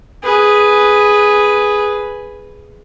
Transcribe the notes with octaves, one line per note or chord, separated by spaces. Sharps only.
G#4 B4